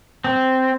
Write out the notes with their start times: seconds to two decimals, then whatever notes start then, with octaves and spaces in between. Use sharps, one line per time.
0.24 C4